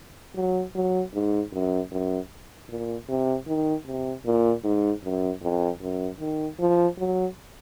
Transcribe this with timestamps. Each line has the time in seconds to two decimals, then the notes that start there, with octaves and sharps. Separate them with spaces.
0.36 F#3
0.75 F#3
1.14 G#2
1.53 F#2
1.92 F#2
2.69 A#2
3.09 C3
3.47 D#3
3.86 C3
4.26 A#2
4.64 G#2
5.04 F#2
5.42 F2
5.81 F#2
6.20 D#3
6.60 F3
6.98 F#3